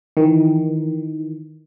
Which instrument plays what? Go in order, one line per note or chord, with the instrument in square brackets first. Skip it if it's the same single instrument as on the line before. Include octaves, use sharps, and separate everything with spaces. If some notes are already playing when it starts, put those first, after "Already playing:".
[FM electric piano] D#3 E3